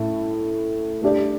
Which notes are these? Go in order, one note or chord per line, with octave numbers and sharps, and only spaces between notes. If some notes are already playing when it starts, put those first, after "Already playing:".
Already playing: A2 A3 E4
A3 D4 G4 D5